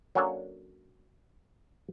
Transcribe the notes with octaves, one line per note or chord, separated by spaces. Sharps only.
F#3 A#3 C#4 D4 A4 C#5